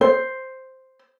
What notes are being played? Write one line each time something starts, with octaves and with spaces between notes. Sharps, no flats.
C5